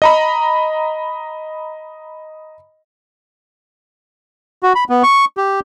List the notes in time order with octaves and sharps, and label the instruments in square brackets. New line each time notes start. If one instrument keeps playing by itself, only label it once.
[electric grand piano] D#5 A#5 B5
[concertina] F#4
B5
B3
C#6
G4